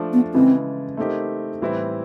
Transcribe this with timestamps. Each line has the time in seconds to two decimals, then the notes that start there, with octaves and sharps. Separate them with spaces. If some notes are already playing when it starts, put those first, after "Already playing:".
Already playing: F3 A3 D4
0.13 B3
0.34 C#3 E3 G#3 C4
0.97 A3 C4 D#4 G4 A#4
1.61 A2 E3 G3 C4 E4